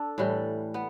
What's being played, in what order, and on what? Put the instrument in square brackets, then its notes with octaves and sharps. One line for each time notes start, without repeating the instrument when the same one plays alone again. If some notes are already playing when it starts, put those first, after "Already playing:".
Already playing: [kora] D4 [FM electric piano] A4
[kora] A2 E3 G3
B3